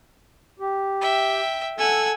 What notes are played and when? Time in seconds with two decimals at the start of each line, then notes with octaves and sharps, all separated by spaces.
0.60 G4
1.01 E5 G5
1.79 A4 F#5 G#5 E6